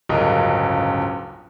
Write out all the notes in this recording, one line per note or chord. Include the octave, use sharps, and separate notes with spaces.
D1 G1 C#2 C#3 A#4 D#5